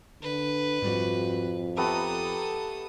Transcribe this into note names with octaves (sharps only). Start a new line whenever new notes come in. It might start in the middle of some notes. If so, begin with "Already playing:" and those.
D3 B4
F2 G#2 G3 F#4
A3 B3 G4 A4 A#5 D#6